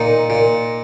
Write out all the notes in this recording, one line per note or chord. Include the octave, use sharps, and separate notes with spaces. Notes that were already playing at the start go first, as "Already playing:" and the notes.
Already playing: A#2 D#4
A#2